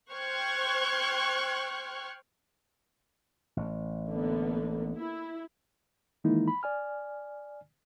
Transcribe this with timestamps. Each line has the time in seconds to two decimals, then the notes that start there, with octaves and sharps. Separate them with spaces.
0.13 C5 G5 C#6 F6 F#6 G#6
3.57 A1
4.08 D3 A#3 B3
4.97 E4
6.24 D#3 E3 G#3 A#3 D#4 E4
6.48 B5
6.63 D5 G#5 F6